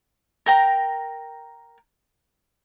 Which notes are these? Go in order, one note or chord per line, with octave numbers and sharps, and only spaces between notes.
A#4 G5 A#5